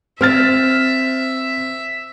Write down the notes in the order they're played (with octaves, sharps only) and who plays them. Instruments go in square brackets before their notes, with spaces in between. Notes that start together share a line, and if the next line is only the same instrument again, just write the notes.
[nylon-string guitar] C4 [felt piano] C5 F6 A6 [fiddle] E5